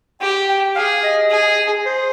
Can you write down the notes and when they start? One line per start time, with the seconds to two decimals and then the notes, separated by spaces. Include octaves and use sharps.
0.21 G4 G5
0.49 G5
0.76 G#4 F5
1.03 D#5
1.30 G#4
1.86 C5